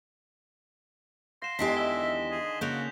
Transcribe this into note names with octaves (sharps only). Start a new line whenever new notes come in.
F5 F#5 C6 A#6 E7
E2 D3 D#3 G#3 E4 G4 B6 C7
E5 G7
G#4
C#3 A#3 F#4 G6 F7